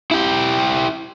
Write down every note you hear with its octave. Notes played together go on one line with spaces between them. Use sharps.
E4 G4